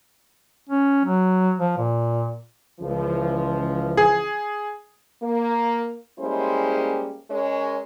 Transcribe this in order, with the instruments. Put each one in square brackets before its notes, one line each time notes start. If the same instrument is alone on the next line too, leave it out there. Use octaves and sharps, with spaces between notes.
[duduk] C#4
F#3
F3
A#2
[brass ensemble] C#2 E3 F3
[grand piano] G#4
[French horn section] A#3
G3 G#3 A#3 C#4 E4 C5
G#3 C#4 A#4 C#5